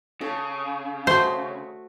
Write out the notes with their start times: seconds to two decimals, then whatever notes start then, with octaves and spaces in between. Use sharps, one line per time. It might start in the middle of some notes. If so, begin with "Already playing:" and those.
0.21 C#3 A4
1.07 A3 F#4 C5